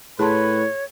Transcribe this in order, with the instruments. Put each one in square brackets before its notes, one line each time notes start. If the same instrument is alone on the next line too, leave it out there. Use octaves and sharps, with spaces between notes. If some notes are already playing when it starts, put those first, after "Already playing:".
[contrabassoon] A2 [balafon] G#4 A5 C6 [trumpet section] B4 B5 [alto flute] C#5